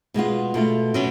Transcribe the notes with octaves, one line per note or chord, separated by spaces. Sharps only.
B2 G#3 B3 F4
B2 A3 F4
B2 F#3 C#4